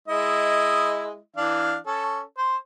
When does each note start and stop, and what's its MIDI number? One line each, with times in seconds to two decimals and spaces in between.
0.08 1.18 56
0.08 1.18 64
0.08 1.18 75
1.36 1.76 52
1.36 1.76 62
1.36 1.76 77
1.87 2.22 61
1.87 2.22 69
2.38 2.56 72